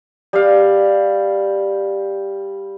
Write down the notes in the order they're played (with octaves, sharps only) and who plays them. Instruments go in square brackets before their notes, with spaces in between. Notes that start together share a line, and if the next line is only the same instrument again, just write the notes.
[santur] G3 F5